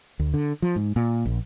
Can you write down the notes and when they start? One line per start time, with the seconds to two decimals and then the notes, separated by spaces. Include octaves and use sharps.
0.19 D2
0.34 D3
0.62 F3
0.76 G#2
0.96 A#2
1.25 A#1